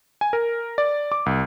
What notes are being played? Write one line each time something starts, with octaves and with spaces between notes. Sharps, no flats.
G#5
A#4
D5
D6
C2